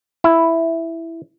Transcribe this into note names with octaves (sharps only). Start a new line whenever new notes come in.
E4